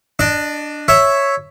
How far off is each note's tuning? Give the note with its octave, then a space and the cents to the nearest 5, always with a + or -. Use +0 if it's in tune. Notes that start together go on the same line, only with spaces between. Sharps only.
D4 +0 D#5 -25
C#5 +0 E5 +0